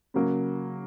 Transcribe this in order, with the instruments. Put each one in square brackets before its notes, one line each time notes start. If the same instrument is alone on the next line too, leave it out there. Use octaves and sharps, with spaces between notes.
[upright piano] C#3 F#3 A#3